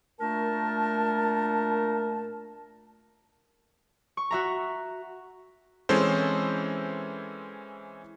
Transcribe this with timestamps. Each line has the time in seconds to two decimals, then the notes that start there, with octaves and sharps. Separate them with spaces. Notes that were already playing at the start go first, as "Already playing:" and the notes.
0.20 A#2 A3 D4 A#4 A5
4.17 C#6
4.31 F#4 E5 A#5
5.89 E3 G#3 C4 C#4 A4 C5